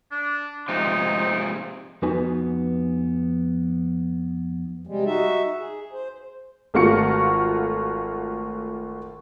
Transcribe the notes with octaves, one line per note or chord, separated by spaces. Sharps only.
D4
G#2 C3 F3 D#4
F2 B3 D#4 F#4 B4 G#5
C3 G3 G#3
D#4 F#4 E5
G#4
C5
G#1 A3 F4 F#4 C#6 C#7